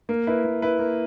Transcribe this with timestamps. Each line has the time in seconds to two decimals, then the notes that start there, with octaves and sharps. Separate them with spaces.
0.09 A#3
0.27 E4 B4
0.44 A#3
0.62 E4 B4
0.79 A#3